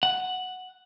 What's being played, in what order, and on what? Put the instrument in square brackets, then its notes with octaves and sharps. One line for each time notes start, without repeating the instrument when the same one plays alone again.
[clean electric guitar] F#5